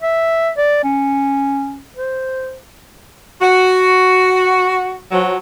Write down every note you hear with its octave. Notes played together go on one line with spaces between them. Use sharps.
E5
D5
C#4
C5
F#4
F3 F#3